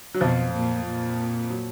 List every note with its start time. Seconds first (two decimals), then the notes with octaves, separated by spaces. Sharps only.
0.14 F#3
0.21 F2 B2 F3
0.53 A#2
0.86 A#2
1.50 F#3